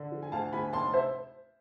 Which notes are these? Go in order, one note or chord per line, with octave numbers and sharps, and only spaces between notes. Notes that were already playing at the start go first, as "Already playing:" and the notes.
Already playing: D3
F3
G#5
D2 F5 A5
D2 G#5 B5
F1 A5 C6
C5 E5